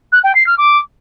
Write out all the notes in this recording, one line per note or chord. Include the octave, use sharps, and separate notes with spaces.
F#6
G5
C7
F6
D6